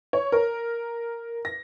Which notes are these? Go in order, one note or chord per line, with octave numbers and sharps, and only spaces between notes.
C#5
A#4
A#6